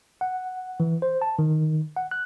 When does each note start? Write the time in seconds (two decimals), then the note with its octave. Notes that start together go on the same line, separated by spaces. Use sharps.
0.21 F#5
0.80 E3
1.02 C5
1.22 A5
1.39 D#3
1.97 F#5
2.11 F#6